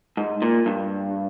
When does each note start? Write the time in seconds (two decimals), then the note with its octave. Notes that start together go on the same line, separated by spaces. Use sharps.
0.17 G#2
0.42 A#2
0.66 G2